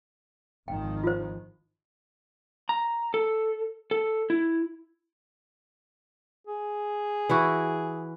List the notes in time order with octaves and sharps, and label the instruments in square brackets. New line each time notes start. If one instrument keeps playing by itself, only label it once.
[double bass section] G#1 D#3 F3 [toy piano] G5
[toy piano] F4 C5
[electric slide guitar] A#5
A4
A4
E4
[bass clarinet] G#4
[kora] E3 E4 F#4